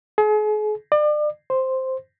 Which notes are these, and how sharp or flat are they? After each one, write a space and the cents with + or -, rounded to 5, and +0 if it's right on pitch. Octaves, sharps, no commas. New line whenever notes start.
G#4 +40
D5 +35
C5 +0